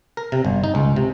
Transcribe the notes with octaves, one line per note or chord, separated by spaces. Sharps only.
A#4
C3
G1
D#4
C#2
C3